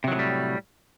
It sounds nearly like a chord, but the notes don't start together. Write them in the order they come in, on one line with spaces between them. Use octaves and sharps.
C3 F#3 D#3 A2 G3